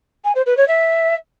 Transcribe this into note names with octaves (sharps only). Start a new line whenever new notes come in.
G#5
C5
B4
C#5
E5